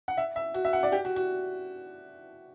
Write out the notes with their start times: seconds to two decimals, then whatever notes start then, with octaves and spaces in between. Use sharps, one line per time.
0.08 F#5
0.17 E5
0.36 E5
0.54 F#4
0.65 E5
0.73 F#5
0.83 D5
0.92 G4
1.05 F#4
1.16 F#4